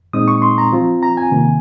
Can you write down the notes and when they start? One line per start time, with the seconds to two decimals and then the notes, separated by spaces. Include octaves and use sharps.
0.13 A#2 G#3 C4 D#4 D#6
0.28 C#6
0.42 C6
0.58 A#5
0.72 F3 C4 F4
1.03 A#5
1.17 G#5
1.32 C3 D#3 A#3